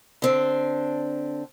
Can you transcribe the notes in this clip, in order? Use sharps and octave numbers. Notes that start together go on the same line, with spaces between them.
D3 C4 D4